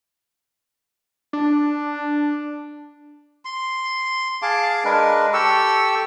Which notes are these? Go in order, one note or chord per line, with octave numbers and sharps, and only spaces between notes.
D4
C6
G#4 F5 A5 D6
G#3 D4 A#4 B4
G4 A4 C#6 E6